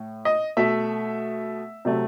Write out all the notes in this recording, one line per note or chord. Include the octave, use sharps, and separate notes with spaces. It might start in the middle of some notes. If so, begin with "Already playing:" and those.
Already playing: A2
D#5
B2 A3 E5
C3 F#3 A3